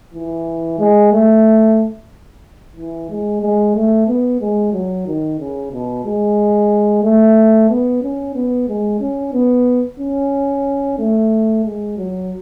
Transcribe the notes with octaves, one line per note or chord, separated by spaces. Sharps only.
E3
G#3
A3
E3
G#3
G#3
A3
B3
G#3
F#3
D#3
C#3
B2
G#3
A3
B3
C#4
B3
G#3
C#4
B3
C#4
A3
G#3
F#3